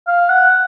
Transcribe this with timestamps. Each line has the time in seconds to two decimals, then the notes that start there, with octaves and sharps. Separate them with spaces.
0.08 F5
0.30 F#5